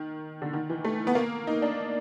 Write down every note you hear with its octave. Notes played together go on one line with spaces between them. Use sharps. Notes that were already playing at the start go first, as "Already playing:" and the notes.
Already playing: D#3
D3
D#3
E3
A3
B3
A#3
D#4
D4